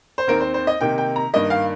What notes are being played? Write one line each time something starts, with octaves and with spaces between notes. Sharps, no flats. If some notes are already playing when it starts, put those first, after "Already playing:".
C5
D#2 D#3 C4 A#4
C5
C5
D#5
C3 D#3 A#3 D#4 G5
G5
A#5
G2 D#3 A#3 D#5
F5